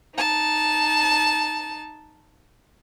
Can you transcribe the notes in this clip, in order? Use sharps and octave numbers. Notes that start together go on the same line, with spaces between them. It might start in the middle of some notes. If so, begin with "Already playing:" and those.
D#4 A5